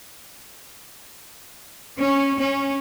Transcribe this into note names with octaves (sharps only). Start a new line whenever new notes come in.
C#4
C#4